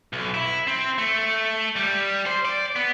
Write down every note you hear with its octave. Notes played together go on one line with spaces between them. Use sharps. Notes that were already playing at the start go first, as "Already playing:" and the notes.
B1
E4
C4
A3
G3
C5
D5
B3